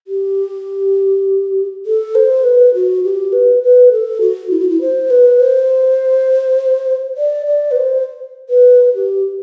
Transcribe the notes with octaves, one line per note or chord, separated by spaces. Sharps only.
G4
A4
C5
B4
F#4
G4
B4
B4
A4
F#4
E4
F#4
E4
C5
B4
C5
D5
D5
B4
C5
B4
G4